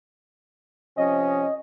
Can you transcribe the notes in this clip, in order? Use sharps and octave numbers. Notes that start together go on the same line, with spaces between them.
C3 F3 C#4 D#5